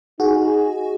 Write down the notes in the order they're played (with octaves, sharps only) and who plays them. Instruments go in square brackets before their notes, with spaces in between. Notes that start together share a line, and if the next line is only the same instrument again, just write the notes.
[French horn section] D#4 G#4 [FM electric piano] F#4